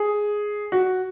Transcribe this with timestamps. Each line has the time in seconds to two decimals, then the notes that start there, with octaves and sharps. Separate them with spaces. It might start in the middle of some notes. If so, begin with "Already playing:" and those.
Already playing: G#4
0.72 F#4